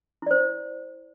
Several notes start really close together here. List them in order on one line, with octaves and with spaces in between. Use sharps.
E4 D5 C5